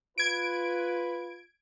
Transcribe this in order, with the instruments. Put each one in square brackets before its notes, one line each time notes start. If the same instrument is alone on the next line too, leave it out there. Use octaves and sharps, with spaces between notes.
[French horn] F4 [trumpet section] B4 [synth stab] G#6 D7